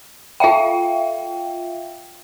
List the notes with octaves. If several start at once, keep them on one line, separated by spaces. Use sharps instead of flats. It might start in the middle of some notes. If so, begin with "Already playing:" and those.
F4 E5 F5 G5